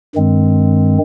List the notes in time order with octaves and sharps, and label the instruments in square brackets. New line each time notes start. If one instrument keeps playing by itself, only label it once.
[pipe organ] G2 D#3 G#3 C4